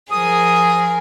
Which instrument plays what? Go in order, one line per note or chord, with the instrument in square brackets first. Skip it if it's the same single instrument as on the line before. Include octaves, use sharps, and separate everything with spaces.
[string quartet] F3 G#4 A#4 [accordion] D#6